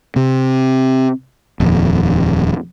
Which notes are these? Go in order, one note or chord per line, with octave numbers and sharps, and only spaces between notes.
C3
D#1 F2